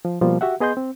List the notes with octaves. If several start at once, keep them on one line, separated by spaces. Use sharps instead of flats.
F3
B2 F3 G3 A#3
F#4 G4 E5 F#5
B3 G#4 D#5 C6 G6
C4